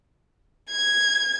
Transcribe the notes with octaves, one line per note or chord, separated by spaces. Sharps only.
G#6